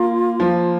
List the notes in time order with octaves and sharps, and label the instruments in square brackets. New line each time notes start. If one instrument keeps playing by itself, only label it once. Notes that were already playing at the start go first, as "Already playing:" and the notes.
Already playing: [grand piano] A#3 [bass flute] F4
[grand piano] F3